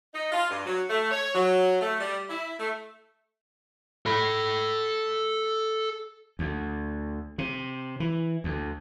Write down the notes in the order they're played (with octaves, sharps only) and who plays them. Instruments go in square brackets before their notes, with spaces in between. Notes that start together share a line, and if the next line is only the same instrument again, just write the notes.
[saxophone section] D#4
F4
G2
F#3
A3
C#5
F#3
A3
G3
E4
A3
[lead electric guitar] A4 B5
[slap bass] D2
C3
E3
D2